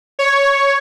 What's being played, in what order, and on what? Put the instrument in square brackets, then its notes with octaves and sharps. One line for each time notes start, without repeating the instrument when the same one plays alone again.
[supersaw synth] C#5